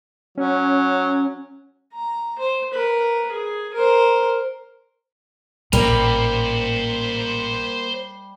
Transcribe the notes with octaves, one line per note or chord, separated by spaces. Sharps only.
F#3 C#4
A#5
C5
A#4 B4
G#4
A#4 C5
A1 A#2 G3 A#3 C5 A#5